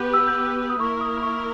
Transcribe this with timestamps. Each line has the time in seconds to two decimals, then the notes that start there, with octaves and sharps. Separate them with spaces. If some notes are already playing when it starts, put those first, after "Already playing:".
Already playing: B3 G4 B4 G6
0.14 E6
0.27 G6
0.40 E6
0.70 D#6
0.80 A#3 E4 A#4 C#6
1.01 D#6
1.23 C#6